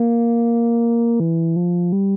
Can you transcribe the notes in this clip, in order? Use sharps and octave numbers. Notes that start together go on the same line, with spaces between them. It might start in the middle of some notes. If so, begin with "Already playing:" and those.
Already playing: A#3
E3
F3
G3